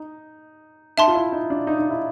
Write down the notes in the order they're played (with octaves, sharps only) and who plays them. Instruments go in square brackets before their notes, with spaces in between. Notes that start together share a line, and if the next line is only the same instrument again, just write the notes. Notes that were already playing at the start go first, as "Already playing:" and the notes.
Already playing: [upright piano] D#4
[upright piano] D#4 [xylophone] E5 A5 C6
[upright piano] F4
E4
D#4
D4
D#4
D#4
E4